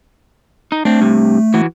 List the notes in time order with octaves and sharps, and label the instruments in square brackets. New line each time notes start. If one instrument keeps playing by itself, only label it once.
[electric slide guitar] D#4
[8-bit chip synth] A3 [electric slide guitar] C4 D4
[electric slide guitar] G2 C3
E3 F#4